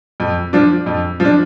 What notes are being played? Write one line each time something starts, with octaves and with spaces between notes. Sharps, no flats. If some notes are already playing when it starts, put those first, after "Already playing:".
F2
F3 D4
F2
F3
D4